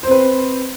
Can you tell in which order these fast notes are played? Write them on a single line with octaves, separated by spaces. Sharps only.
C5 C4 B4